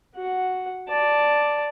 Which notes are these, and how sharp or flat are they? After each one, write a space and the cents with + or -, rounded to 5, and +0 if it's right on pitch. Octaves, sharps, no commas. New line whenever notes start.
F#4 +0 F#5 +0
D5 +0 A5 +0